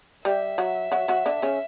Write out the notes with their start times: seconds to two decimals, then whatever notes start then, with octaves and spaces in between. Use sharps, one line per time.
0.24 G3 G4 E5
0.58 F#3 F#4
0.92 F#3 F#4
1.08 F#3 F#4
1.26 D3 D4
1.42 C#3 C#4